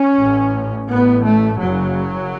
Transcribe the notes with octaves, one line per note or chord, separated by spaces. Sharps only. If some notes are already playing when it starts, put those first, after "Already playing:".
Already playing: C#4
A1 A2
A1 A2 B3
A3
F#1 F#2 C#3 F#3